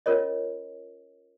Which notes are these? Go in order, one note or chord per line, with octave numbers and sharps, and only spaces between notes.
C#4 F4 A#4 C#5 D#5